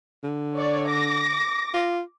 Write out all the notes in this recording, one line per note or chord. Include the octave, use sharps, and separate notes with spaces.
D3
C#5 D5
D6 A#6
F4